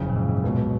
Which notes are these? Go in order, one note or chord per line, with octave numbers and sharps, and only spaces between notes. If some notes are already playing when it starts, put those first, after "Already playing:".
Already playing: F#1 F2 C#3
A#2
G#2
G#2
C#2 B2 F#3